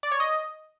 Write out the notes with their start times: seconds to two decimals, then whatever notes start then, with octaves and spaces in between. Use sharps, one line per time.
0.03 D5
0.12 C#5
0.20 D#5